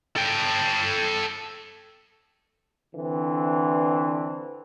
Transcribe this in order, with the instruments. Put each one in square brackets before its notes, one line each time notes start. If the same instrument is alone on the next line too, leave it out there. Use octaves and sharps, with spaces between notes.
[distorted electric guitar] A4 G5
[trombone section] D3 E3 C4 D4